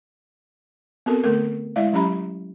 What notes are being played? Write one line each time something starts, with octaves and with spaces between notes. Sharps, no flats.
B3 C4 F#4 A4 A#4
D3 A3 A4 A#4
G#3 E4 D5 E5 F5
F#3 C#4 G4 A#5 B5